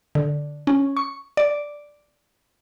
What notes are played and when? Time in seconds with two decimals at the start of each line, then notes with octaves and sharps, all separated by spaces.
0.15 D3
0.67 C#4
0.97 C#6
1.37 D5